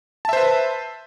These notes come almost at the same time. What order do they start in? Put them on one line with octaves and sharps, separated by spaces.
A5 E5 C5 B4